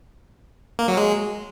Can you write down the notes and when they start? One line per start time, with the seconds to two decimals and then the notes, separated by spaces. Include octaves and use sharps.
0.79 A#3
0.88 F#3
0.97 G#3